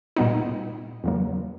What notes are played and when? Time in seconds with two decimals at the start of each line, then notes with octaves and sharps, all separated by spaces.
0.16 A#2 G3 B3 D#4
1.04 E2 C#3 F#3 A#3